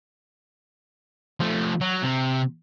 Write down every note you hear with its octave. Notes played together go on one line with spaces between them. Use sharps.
F3 A3
F#3
C3